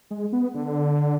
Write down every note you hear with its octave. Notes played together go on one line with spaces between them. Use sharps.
G#3
B3
D3